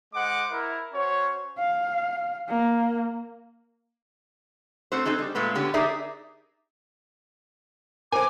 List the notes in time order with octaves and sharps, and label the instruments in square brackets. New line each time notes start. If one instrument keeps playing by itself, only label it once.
[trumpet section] G#3 C5 D#5 F#5 D6
E4 A#4
C#4 F#4 C5 C#5
[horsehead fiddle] F5
A#3
[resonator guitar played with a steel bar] A3 C4 F#4 C5
C4 D#4 G#4 A4
G3
A#2 G#3 A3 B3 B4
D3 B3 C#4 G4
D#4 G4 G#4 A#4 D5 E5
[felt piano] A#4 C5 [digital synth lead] G#5 [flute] D6